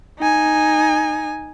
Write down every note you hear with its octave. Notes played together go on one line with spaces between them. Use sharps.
D#4 G#5